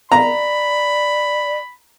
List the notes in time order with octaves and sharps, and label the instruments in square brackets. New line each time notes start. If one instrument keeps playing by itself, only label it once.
[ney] D5 [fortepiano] A#5 [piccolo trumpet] B5